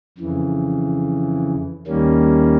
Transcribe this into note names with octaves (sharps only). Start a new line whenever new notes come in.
F2 C#3 E3
D#2 D#3 G3 A#3 C#4